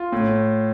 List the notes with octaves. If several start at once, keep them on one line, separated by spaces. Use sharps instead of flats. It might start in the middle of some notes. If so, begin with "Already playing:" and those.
Already playing: F4
A2